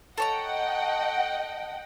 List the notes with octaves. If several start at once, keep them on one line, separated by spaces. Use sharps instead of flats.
A4 C#5 D#5 F#5 G5 A#5